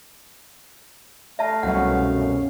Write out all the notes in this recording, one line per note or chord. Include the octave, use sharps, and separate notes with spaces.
A3 E5 F5 A5
C2 F#2 B2 C#4 F#5